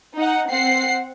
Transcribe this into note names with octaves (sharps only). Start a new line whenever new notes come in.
D#4 F#5
C4 F#5 C7